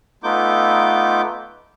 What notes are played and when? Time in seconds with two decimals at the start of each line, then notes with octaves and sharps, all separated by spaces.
0.24 A3 B3 D#4 F4 D6 G6